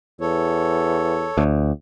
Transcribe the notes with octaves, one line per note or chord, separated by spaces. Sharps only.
E2 A4 C#5
D2